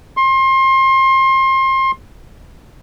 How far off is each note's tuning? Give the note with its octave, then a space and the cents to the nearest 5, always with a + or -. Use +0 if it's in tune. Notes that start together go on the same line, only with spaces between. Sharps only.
C6 +30